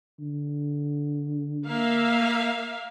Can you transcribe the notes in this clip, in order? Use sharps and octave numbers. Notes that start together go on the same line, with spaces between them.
D3
A#3 E5 F5